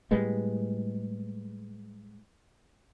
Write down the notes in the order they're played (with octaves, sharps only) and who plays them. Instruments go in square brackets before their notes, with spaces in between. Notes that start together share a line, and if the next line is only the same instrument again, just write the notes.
[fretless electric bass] A2 G3 G#3 B3